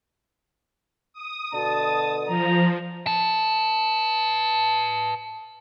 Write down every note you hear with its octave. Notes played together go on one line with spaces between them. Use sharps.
D#6
B2 D3 A5
F3 A#5
B4 A5